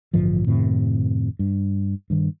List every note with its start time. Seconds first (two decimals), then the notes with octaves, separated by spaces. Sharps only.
0.14 A1 G2 D3 F3
0.46 F#2 A2 C3 D#3
1.39 G2
2.10 G2 D#3